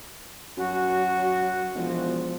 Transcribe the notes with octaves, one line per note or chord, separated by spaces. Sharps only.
F#2 F#3 F#4
E1 F3